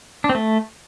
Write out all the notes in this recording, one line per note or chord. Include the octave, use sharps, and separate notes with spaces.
D4
C4
A3